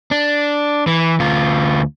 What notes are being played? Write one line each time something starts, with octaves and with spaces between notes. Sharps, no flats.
D4
E3
D2 F4